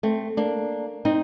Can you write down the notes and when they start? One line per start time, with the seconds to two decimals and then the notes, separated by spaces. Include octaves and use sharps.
0.03 A3 C4
0.37 A#3 D4
1.05 C4 D#4